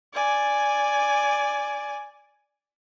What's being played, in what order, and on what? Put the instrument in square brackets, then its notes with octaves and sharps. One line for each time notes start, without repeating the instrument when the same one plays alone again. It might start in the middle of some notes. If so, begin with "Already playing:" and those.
[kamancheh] D5 G#5